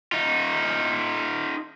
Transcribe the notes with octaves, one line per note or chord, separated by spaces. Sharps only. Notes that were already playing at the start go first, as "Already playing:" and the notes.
D#4 F4